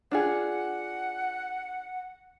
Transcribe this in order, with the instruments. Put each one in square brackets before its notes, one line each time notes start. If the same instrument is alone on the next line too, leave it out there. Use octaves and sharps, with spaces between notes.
[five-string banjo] D4 F4 G#4 [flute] F#5